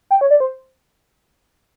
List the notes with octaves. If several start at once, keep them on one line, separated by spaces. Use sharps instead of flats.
G5
C#5
D5
C5